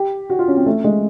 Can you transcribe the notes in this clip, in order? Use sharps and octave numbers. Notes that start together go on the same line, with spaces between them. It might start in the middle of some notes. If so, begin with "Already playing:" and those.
Already playing: G4
F#4
F4
C#4
C4
A3
G#3